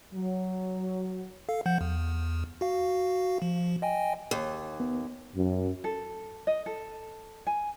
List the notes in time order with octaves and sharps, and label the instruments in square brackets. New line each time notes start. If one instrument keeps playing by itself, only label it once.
[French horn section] F#3
[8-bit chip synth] A4 F5
F3 F#5 G6
E2
F#4 F5
F3
D#5 G5 G#5
[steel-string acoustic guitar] D#2
[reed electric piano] B3
[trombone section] F#2
[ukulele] A4
D#5
A4
G#5